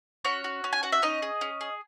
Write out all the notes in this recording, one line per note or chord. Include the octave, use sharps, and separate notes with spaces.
C#4 F#4 C#5
F#4
C#4
G#5
F#4 F#5
E5
C#4 D#4 D#5
G#4
C#4
G#4